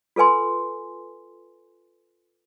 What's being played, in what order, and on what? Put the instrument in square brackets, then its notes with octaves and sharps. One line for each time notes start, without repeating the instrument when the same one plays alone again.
[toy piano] F4 A4 B4 G#5 C6